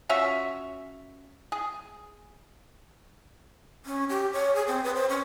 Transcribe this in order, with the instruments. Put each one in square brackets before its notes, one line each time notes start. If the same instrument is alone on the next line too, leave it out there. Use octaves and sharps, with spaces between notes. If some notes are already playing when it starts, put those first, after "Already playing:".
[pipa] C#4 F4 F#4 E5
G#4
[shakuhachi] C#4
G4
C#5
G#4
C4
B4
C5
C#4